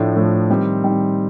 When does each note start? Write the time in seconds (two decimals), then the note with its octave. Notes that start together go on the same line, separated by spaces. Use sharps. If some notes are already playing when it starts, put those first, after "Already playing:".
Already playing: A2 F3 A3 D4
0.16 A2 F3 A3 D4
0.49 D#3 G3 C4
0.83 D#3 G3 C4